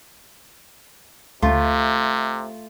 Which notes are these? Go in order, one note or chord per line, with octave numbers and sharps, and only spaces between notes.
D2 C3 A3 F4